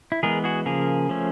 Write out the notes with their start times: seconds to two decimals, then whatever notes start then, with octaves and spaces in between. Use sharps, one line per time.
0.12 E4
0.23 E3 G#3 B3 G#4 A#4
0.44 F#4 G#4
0.66 C#3 F3 A#3 G#4 A#4
1.09 F3 A3 C#4